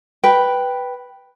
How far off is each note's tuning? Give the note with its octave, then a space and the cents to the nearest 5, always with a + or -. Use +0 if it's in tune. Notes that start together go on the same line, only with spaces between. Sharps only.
B4 +0 G5 +0